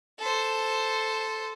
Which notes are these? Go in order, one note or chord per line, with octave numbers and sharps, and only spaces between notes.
A4 C5